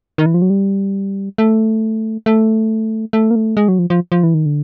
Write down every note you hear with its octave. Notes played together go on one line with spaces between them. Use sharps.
D#3
E3
F3
F#3
G3
A3
A3
A3
A#3
A3
G#3
F#3
F3
F3
F3
E3
D#3
D3